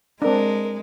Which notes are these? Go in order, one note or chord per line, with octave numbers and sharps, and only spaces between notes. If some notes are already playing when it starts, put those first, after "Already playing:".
G#3 C4 D4 A#4